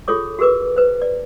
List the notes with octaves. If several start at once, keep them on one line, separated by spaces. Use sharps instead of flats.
F4 G#4 A4 C#5 D6
F#4 G#4 A#4 B4 D6
B4 C5
D5